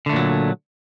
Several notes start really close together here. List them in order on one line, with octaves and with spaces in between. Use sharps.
D3 A3 A#2 F#3